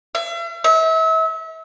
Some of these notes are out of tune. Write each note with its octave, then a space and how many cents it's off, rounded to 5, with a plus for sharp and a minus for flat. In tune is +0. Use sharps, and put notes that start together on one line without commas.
E5 +45
E5 -35